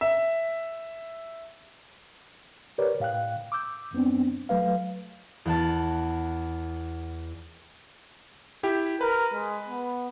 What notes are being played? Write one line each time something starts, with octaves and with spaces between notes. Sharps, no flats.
E5
G4 A#4 B4 C#5 D5
A2 F5 G5 F#6
D6 E6 G6
F#2 B3 C4 D4
F#3 A3 B4 F5
E2 F#5 A5
E4 G4
A#4 B4
G#3
B3